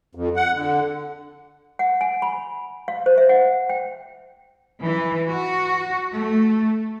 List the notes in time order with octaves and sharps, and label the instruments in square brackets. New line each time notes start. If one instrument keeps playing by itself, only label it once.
[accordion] F2
F#5
D3
[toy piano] F#5
G#5
B5
F5
C5
E5
F#5
G5
[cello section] E3
F#4
A3